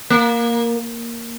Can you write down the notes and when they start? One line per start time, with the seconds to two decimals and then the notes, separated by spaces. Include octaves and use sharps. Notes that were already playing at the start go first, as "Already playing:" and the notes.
0.10 A#3